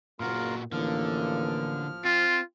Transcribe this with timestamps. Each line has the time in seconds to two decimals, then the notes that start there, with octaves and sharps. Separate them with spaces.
0.20 F#1 A#2 A#3 F4 F#4 A#4
0.72 A1 D3 E3 F3 A#3 F6
2.05 C4 F4